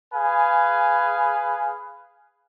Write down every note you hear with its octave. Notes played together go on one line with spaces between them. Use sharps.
G#4 B4 F5 G#5